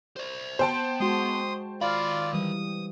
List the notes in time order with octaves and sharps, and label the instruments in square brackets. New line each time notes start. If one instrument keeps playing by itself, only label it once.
[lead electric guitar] C5 D5
[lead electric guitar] B3 [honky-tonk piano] C5 G5 A5
[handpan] G#3 F#4 [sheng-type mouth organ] C6 D#6
[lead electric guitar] D#3 B5 [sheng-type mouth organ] F4 D5 [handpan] F5
[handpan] E3 G3 [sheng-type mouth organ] D#6